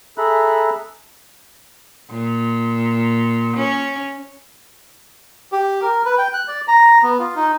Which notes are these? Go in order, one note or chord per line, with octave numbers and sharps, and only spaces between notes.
G#4 A4 E5 A#5 B5 F#6
A#2
C#4
G4
A#4
B4
G5
F#6
D5
A#5
B3
F4
D#4